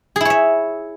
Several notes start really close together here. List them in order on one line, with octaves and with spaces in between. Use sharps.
G#4 E4 C#5 E5